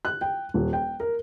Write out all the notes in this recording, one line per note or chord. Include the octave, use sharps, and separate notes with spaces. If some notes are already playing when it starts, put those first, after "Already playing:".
F#6
G5
D#1
G5
A#4